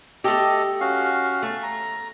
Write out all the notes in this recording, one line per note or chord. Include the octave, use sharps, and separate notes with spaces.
A3 G4 A4 D#5
C#4 F#4 F5
A3
A#5